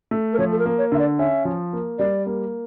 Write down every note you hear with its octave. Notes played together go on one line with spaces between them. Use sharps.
A3
A#4
F3 C#5
A4
A#4
A#3
C#5
D3 E5
D5
C#4 E5
F3
A#3
G3 D5
A#3